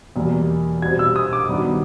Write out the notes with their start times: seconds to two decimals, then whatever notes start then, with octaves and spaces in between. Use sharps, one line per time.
0.16 E2 B2 G3 A#3
0.82 B2 G3 C4 G#6
0.99 E6
1.16 D#6
1.33 D6
1.49 G2 D#3 F#3 B3